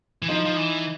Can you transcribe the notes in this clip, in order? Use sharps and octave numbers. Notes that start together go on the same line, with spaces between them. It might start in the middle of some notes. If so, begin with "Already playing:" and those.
E3
F3 D#4
F3
E3